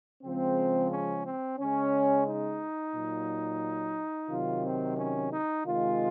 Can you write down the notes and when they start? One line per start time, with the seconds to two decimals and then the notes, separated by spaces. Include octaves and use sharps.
0.23 C#3 F3 G#3 C4
0.91 C#4
1.26 C4
1.59 C#3 G#3 C#4
2.26 D#4
2.95 A#2 F#3
4.30 C3 D#3 F#3 F4
4.64 C4
4.98 C#4
5.32 D#4
5.66 C3 D#3 G#3 F4